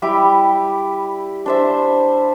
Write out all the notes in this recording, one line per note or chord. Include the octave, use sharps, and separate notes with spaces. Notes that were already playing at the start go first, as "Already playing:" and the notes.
G3 E4 G4
D4 C5 E5